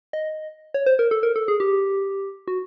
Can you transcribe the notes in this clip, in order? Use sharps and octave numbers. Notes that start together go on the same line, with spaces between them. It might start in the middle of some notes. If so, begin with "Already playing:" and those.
D#5
C#5
C5
A#4
A4
A#4
A4
G#4
G4
F#4